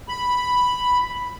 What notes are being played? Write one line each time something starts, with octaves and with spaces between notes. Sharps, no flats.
B5